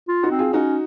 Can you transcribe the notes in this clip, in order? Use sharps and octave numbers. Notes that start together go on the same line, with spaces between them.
F4
D#4 F#4
C4
F4 G#4
C#4 D#4 F#4